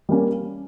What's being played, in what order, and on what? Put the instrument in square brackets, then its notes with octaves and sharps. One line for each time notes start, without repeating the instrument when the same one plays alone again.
[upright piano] G3 A#3 C#4